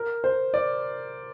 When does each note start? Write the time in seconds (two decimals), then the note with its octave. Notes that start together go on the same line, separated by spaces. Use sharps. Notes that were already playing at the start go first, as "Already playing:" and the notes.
Already playing: A#4
0.24 C5
0.54 D5